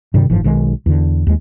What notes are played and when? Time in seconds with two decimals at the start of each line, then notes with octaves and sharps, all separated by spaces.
0.14 G2 C3 D#3 G3
0.30 F#1 G#2 E3 F3
0.44 B1 D#3 G#3
0.86 E2 D3
1.27 D#2 G#3